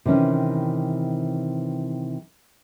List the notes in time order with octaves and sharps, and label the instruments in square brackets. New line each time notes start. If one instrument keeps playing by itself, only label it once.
[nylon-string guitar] C3 D#3 E3 C#4